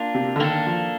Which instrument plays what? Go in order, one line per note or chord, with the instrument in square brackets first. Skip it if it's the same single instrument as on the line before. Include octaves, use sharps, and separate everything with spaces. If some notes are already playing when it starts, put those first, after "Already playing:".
Already playing: [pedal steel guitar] A#3 D4 F4
[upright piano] C3
D3
[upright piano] D#3 [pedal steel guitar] A#3 D4 A4
[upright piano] F3